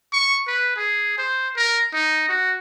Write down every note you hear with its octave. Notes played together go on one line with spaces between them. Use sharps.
C#6
B4
G#4
C5
A#4
D#4
F#4